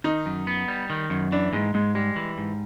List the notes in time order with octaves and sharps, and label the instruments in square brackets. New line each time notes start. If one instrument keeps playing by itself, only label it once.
[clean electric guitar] D#3 [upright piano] D#4
[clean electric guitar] F#2
B3
G3
D#3
F#2
[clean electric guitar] E3 [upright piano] D4
[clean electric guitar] G#2 [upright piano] G#3
[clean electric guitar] G#2 [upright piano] G#3
[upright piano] G3 [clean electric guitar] G#3
[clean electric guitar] E3
G#2